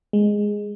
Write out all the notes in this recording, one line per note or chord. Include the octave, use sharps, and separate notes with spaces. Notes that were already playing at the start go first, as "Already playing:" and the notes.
G#3